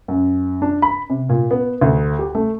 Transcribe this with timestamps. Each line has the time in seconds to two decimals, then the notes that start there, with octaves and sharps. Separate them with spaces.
0.08 F#2
0.62 D4
0.82 B5
1.10 C3
1.29 A#2
1.51 B3
1.81 D2
2.19 G4
2.35 A3